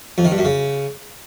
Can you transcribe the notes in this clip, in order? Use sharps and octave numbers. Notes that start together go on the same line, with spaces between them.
F2
D#3
G2
F#2
C#3